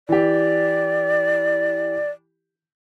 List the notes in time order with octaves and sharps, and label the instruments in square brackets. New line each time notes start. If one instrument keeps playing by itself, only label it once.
[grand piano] E3 G4 [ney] D5